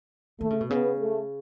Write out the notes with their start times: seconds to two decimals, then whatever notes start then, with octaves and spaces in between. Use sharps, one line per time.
0.40 D#3 A3
0.50 C#3
0.61 B2
0.69 C#3 B3
0.99 A3